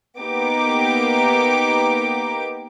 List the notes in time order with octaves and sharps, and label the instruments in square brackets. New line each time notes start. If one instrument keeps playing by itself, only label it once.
[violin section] A#3 B3 D#4 G4 D6